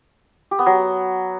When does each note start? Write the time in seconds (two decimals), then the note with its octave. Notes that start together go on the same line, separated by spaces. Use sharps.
0.51 G4
0.59 B3
0.66 F#3